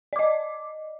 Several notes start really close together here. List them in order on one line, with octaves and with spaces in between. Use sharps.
D5 D6 D#5